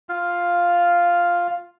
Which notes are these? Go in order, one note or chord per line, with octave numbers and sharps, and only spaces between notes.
F4 F5